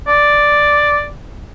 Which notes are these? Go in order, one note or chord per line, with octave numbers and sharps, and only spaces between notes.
D5